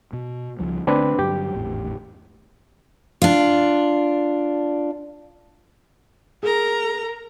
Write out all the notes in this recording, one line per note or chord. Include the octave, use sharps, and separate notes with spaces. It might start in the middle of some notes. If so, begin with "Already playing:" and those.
B2
C#2 F3 G3
D3 A3 B3 C4 D4 B4
G2 D3 F#3 G4
G#1 E2 A2
D4 F4
G#4 A#4 A#5